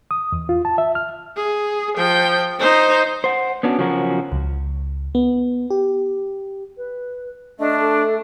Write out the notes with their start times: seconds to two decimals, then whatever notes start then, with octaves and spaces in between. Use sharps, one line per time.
0.11 D#6
0.32 E2
0.49 F4
0.65 A5
0.78 E5
0.95 F6
1.37 G#4
1.97 F3 G5
2.59 D#4 C5
3.24 C5 F#5
3.63 B3 C#4 D4 F#4
3.78 C#3 F3 F#3 C#4 F#4 A#4
4.32 C#2
5.15 B3
5.70 G4
6.77 B4
7.59 A3 D4 D#5
7.80 A4